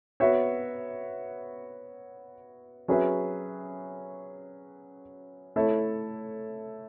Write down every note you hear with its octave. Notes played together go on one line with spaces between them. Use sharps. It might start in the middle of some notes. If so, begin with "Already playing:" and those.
B3 F#4 C#5 E5
F#3 C#4 G#4 B4 E5
A3 E4 A4 C#5